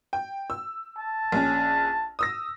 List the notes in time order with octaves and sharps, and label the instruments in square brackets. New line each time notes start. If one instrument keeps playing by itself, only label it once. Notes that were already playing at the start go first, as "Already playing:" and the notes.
[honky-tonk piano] G5
E6
[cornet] A5
[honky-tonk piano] A#1 C#4
D#6 E6 A#6